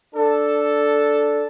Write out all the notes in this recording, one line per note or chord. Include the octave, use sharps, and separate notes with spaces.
D4 A4